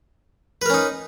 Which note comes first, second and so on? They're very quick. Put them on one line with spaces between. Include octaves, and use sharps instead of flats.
B4 A#4 C#4 D#4